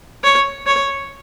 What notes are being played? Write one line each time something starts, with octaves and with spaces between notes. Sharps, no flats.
C#5
C#5